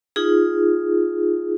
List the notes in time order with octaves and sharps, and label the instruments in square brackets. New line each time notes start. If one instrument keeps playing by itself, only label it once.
[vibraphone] D#4 F4 G#4